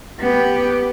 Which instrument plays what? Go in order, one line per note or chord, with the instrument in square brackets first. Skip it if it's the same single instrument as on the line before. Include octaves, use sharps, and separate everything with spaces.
[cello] B3 G4